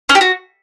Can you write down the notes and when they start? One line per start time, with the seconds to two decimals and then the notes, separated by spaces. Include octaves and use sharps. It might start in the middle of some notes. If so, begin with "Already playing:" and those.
0.09 C#4
0.15 G4
0.21 F#4